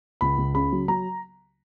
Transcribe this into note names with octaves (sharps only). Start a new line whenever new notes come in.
C#2 B5
C#2
C#3 B5
F#3
F#3 A#5